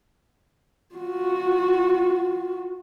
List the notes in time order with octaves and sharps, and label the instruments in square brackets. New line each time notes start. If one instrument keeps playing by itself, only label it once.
[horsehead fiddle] F4 F#4